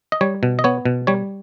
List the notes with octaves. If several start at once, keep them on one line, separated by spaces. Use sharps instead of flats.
D#5
G3 C#5
B2
D#5
B3 C#5
B2
G3 C#5